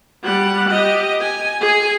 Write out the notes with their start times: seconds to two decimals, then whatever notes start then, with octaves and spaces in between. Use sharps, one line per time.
0.23 G3 F#5
0.69 G4 D#5
1.20 G#5
1.61 G#4 G#5